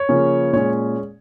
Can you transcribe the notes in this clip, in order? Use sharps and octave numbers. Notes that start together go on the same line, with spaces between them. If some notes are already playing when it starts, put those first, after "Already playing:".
Already playing: C#5
C#3 F3 A#3 C#4
A#2 G#3 C#4 C#5